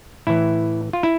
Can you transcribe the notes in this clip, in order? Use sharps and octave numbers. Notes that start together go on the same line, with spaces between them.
A2 E3 E4
F4
E4